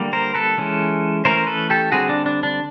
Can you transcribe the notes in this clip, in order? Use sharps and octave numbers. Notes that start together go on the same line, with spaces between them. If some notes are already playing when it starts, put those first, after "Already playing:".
Already playing: D3 G3 A#3
A#4 C5
A4 B4
E3 G#3 C#4
E3 A3 C#4 A#4 C5
A4 B4
G4 A4
D3 G3 C4 F#4 G#4
D4
D4
D4